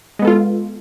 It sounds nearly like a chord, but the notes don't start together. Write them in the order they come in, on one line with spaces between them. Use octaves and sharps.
G#3 B3 A4 F4